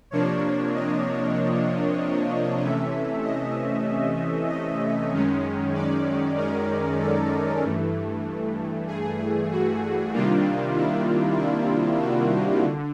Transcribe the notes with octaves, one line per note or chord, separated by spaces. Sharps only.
C3 F3 A#3 D4 C#5
D#5
C3 E3 A3 C#4 E5
D#5
D#5
F#2 D#3 G#3 C#4
D5
A#4
A4
G2 E3 A3
G#4
F#4
C3 D#3 G3 A#3 D4 F4
E4
E4
F#4
D3